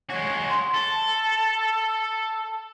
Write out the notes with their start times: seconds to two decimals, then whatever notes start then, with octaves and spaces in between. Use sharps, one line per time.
0.10 G#3 F#4 C#5
0.49 C6
0.74 A4
0.90 A5